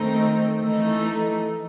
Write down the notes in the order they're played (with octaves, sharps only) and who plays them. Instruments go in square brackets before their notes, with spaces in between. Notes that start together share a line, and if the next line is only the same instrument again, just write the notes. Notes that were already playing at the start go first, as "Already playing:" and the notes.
Already playing: [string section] D#3 A3 C4 D#4
E3 A3 D#4